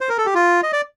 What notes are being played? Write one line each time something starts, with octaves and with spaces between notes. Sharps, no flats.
C5
A#4
A4
G4
F4
D#5
D5